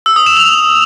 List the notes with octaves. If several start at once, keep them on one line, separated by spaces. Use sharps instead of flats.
E6
D#6
E7
F7